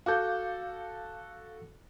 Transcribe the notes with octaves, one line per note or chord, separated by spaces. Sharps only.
F#4 A4 F5 D6 G6